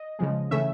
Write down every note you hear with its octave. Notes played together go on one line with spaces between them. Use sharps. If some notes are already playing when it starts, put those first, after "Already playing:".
Already playing: D#5
C#3 F3 G#3
C#3 E3 A3 C#4 E5